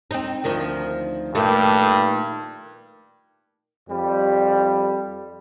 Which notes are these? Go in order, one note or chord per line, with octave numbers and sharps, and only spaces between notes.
C4 D#4
D2 D#3 F3
G2 A#2 D#3 A3
F2 G3